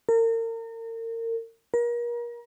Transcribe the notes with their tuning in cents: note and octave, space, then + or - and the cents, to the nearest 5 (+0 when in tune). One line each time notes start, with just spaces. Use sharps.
A#4 -35
A#4 +35